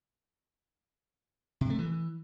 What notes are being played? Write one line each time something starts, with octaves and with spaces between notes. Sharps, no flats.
C3
A3
E3